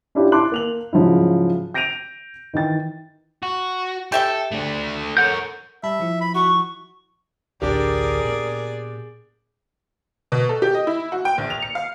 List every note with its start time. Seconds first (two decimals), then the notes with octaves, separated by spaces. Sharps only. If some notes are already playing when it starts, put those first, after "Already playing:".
0.15 C#4 D4 E4 F4 G4
0.32 E4 A5 C6 D6 F#6 F#7
0.52 A#3 F7 F#7
0.93 G#2 C#3 F3 F#3 E4
1.74 G6 A#6 D7 D#7 F7
2.54 D#3 E3 G5 A6
3.43 F#4
4.12 G4 A4 E5 G5
4.52 A3 D4
5.17 A4 A#4 C#5 F#5 G6
5.83 G3 E5 A5 B5
6.00 F3 E4
6.21 B5
6.35 F#4 C#6
7.62 A1 D2 D4 G4 G#4 A#4 D5
8.25 A#2 A#3 B3
10.32 B2
10.49 A4
10.62 G4
10.74 D#5
10.87 E4
11.12 F#4
11.25 G5
11.38 A#1
11.50 F7
11.62 C#7
11.75 F5